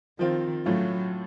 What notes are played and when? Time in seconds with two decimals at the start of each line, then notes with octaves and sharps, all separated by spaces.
0.19 D#3 F3 C4 F4
0.66 A2 F#3 A3 C#4 F4